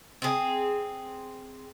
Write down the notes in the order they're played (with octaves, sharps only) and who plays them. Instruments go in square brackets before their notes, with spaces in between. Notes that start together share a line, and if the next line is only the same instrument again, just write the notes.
[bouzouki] C4 G#4